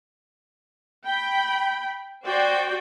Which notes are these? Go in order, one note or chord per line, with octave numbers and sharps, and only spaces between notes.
G5 B5
F#4 C5 D5 G5